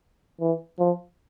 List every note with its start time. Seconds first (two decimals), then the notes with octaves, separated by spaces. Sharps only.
0.41 E3
0.79 F3